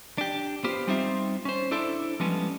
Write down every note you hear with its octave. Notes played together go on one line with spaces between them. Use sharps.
D4 G4
B3 F4 G4 C5
G3 C4 D#4 F4 C5 E5
C#4 C5
D4 E4 A4 C5 D5 E5
F3 G3 G#3 B3 C#4